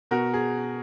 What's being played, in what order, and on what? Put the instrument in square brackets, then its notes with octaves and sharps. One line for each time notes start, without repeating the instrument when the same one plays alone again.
[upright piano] B2 F#4 A#4
G#4